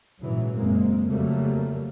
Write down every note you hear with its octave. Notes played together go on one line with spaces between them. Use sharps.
A#1 G#2 C#3 E3 F#3
F#1 F#2 G#3 A#3 C4
F2 C#3 F#3 G3 A3 A#3